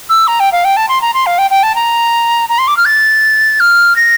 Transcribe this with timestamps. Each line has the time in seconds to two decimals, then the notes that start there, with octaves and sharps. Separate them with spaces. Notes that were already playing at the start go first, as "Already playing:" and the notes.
0.09 E6
0.27 A#5
0.40 G5
0.52 F5
0.64 G5
0.77 A5
0.89 C6
1.02 A#5
1.14 C6
1.26 F5
1.38 G5
1.50 G5
1.63 A5
1.75 A#5
2.49 A#5
2.58 C6
2.68 D6
2.77 F6
2.85 A6
3.60 F6
3.96 A#6